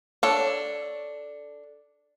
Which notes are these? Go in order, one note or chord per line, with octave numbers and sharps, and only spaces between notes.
D4 A4 C#5